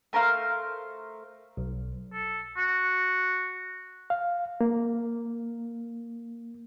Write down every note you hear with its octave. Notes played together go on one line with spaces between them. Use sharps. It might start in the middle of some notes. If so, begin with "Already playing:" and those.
A3 A#4 C5 F5
B1
A4
F#4
F5
A#3